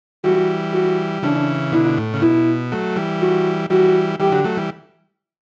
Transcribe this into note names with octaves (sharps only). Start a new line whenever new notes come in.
E3 G3 F#4
F#4
C#3 E3 D4
B2 D3 E4
A2
C#3
B2 E4
F#3 A3
E3 G3
F#4
E3 G3 F#4
E3 G3 G4
D3 F#3
F#3 A3
E3 G3